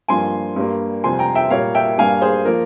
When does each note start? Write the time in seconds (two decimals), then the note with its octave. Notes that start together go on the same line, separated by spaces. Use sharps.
0.08 G2 F3 A#3 G#5 C6
0.56 G2 G3 A#3
1.03 F2 C3 G3 G#5 C6
1.19 G5 A#5
1.35 E5 G5
1.51 A#2 G3 A#3 C#5 F5
1.75 E5 G5
1.98 G2 G3 A#3 F5 G#5
2.22 G#4 C5
2.45 F3 A#3 A#4